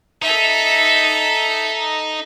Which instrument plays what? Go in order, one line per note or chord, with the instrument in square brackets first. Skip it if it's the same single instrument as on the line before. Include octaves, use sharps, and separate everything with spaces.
[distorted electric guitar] D#4 [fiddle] A4 E5